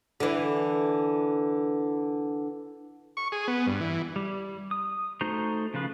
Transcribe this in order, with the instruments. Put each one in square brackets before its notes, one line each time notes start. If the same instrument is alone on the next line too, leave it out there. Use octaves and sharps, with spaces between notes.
[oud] D3 E3
[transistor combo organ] C#6
G#4
B3
G2
E3
[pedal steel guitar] G3
D#6
A3 D#4 F#4 C5 A#5
C#3 F3 F4 B4